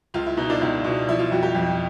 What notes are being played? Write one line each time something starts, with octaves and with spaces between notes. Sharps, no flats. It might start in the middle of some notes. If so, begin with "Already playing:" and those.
C#2 F4
E4
B2 D#4
D4
C#2 E4
B2
F3 E4
F4
F2 F#4
G4
F2